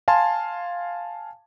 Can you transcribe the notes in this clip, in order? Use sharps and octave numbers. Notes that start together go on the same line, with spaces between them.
F5 G#5 A5 C6